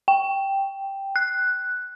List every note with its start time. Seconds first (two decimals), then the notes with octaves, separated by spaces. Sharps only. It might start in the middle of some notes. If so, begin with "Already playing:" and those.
0.08 G5
1.16 F#6